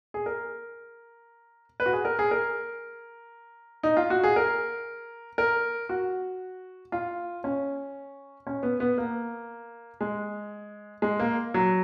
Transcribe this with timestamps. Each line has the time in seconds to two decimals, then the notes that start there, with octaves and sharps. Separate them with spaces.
0.14 G#4
0.26 A#4
1.80 B4
1.86 F#4
1.93 G#4
2.05 A#4
2.19 G#4
2.31 A#4
3.83 D#4
3.97 F4
4.10 F#4
4.23 G#4
4.36 A#4
5.38 A#4
5.89 F#4
6.92 F4
7.44 C#4
8.47 C#4
8.63 B3
8.80 B3
8.98 A#3
10.01 G#3
11.02 G#3
11.20 A#3
11.54 F#3